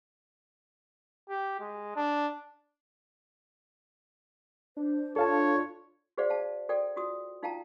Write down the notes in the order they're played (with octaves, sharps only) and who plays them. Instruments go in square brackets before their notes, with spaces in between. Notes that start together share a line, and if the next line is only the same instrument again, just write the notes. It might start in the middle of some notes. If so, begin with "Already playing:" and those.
[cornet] G4
G#3
D4
[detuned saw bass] D4 [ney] C5
[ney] F4 [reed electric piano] A4 F5 A5 [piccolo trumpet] C#5
[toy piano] F#4 G#4 C5 D5 F5 F#5
F5 F#5 A5
F#4 A4 D5 G5
F4 F#4 D#6
D#4 F4 F5 G5 A5 A#5